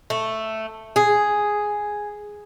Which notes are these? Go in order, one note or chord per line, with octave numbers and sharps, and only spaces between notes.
A3
G#4